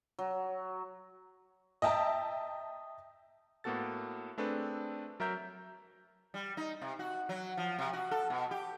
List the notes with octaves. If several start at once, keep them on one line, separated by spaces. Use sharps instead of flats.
F#3
D#5 E5 G5 A5 A#5
A2 A#3 B3 F#4 A4 A6
A3 C4 D4 G#4 A4 B4
F#3 A#4 E5 A#5 G6
G3
D#4
C3
F#4
F#3
F3
C3
F#4
A4
B2
G4